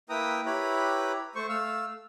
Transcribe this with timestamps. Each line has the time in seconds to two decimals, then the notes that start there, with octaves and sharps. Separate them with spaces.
0.09 A#3 E4 B4 G5 A#5 D#6
0.46 E4 G4 B4 C#5 A#5 B5
1.35 A3 C5 C#6
1.49 A3 F5 E6